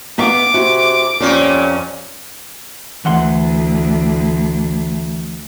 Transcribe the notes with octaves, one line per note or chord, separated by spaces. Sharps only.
B3 E5 F5 D6
C3 F#4
F2 A#2 G3 C#4
D2 E3 F#5 C6